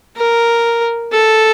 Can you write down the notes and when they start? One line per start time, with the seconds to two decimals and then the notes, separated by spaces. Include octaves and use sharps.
0.17 A#4
1.12 A4